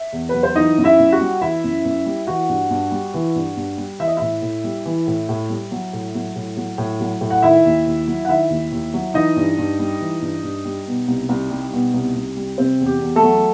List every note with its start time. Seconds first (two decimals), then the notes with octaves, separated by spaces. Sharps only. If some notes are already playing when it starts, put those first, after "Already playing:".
Already playing: E5
0.12 E2
0.29 F#3 B4
0.43 C5
0.55 E3 D#4 D#5
0.78 F#2
0.84 E4 E5
0.99 F#2
1.12 F#4 F#5
1.20 G3
1.41 E3 E4 E5
1.64 F#2
1.85 F#2
2.06 G3
2.27 E3 F#4 F#5
2.49 G2
2.70 G2
2.91 G3
3.14 E3
3.35 G2
3.57 G2
3.78 G3
3.99 E3 E5
4.08 D#5
4.17 A2 E4 E5
4.42 A2
4.64 G3
4.86 E3
5.07 A2
5.29 A2
5.49 G3
5.71 F#3
5.93 A2
6.15 F#3
6.36 A2
6.57 F#3
6.78 A2
7.00 F#3
7.21 A2
7.31 F#5
7.42 D#3 E4 E5
7.65 D#2
7.86 D#2
8.07 F#3
8.25 F#5
8.28 D#3 E4 E5
8.50 D#2
8.72 D#2
8.94 F#3
9.14 E3 D#4 D#5
9.36 G2
9.58 G2
9.79 G3
10.00 E3
10.22 G2
10.43 G2
10.65 G3
10.87 B2
11.08 C2
11.29 C2
11.51 G3
11.73 B2
11.94 C2
12.16 C2
12.37 G3
12.58 C3 C4 C5
12.80 E2
12.86 G4
13.01 E2
13.16 A3 A4
13.23 F#3